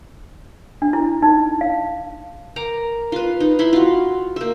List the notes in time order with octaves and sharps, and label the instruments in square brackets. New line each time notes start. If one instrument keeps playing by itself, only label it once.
[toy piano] D4
E4
D#4
F5
[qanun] A#4 A#5 D6
F4 B4
D#4
E4 B5 C6
F4 F#4
A#3 E5